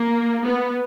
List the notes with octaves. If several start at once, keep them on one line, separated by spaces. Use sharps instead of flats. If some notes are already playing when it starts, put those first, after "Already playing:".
Already playing: A#3
B3